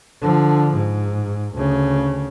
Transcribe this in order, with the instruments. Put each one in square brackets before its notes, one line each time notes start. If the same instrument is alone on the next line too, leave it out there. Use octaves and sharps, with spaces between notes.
[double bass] D3 F3
G#2
D2 C#3